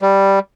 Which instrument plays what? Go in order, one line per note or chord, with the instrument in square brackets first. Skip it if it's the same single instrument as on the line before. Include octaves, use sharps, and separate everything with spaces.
[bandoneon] G3